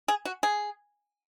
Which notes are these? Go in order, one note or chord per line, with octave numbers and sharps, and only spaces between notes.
G#4
F#4
G#4